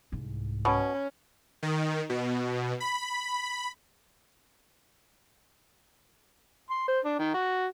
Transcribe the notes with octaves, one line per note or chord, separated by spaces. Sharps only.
C2 G#2
B2 C#4
D#3
B2
B5
C6
C5
D4
D#3
F#4